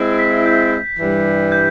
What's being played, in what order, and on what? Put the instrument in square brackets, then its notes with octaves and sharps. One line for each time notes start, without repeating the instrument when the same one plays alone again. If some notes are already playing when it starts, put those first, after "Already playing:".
Already playing: [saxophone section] G#3 C4 E4
[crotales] B6
G6
[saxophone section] G2 E3 G3
[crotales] G6